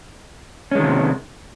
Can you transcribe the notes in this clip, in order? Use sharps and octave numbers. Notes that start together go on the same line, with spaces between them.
C3 D#3 G#3 C#4